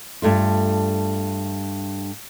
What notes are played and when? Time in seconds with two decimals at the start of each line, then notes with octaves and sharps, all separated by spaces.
0.22 G2 A3 F4